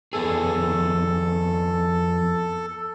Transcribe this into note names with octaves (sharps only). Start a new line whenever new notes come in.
F2 B3 G#4 A4